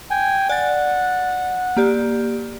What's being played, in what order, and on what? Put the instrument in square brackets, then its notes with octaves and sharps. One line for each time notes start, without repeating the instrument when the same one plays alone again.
[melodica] G5 G#5
[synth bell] D5 A6 [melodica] F#5
[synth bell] A#3 G4 D5